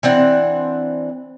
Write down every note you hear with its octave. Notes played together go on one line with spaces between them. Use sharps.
E3 C4 D4 F#5